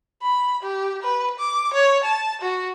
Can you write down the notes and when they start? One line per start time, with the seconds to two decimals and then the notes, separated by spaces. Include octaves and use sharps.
0.22 B5
0.63 G4
1.02 B4
1.39 D6
1.74 C#5
2.04 A5
2.41 F#4